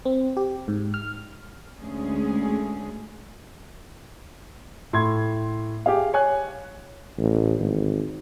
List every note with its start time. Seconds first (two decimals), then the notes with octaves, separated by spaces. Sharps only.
0.05 C4
0.37 G4
0.68 G#2
0.94 F6
1.80 D2 G#3 C#4 G#4
4.93 A2 C6 G#6
5.86 G4 G#4 F5
6.14 C#5 G#5 F#6
7.18 A1
7.59 G#1